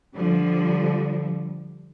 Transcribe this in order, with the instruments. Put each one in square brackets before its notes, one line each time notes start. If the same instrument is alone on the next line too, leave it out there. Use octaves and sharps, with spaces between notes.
[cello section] D3 F3 G3